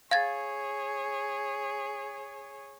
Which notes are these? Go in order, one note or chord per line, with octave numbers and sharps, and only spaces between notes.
G#4 C#5 F5 G#6 A6